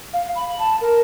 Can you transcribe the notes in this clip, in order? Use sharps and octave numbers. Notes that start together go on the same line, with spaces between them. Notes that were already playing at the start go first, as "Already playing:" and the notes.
F5
B5
A5
A#4